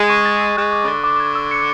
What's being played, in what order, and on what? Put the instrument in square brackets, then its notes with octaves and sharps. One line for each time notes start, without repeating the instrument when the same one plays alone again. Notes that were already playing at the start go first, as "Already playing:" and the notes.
Already playing: [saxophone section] G#3
[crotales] C#6
A6
E6
[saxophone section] G#3 [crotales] F#6
[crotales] D6
[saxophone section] C#3
[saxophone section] D3 [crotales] A6
[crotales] D6
G#6
E6
C#7